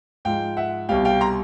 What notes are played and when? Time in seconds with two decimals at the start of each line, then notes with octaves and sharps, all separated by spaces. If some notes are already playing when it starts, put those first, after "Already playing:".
0.25 G#2 F3 G#3 F5 G5
0.57 E5 F#5
0.89 C2 B2 G3 F5 G5
1.05 F5 G5
1.21 A#5 C6